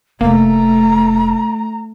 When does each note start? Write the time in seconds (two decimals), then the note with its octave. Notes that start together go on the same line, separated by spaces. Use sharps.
0.21 F1 A3 A#3 A#5